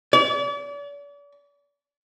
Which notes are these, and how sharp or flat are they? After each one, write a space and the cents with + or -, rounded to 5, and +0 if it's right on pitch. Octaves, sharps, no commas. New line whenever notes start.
D5 -40